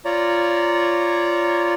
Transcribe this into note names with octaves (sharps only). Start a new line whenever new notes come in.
F4 C#5 D5 A#5